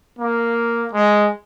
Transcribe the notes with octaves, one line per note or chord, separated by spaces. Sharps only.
A#3
G#3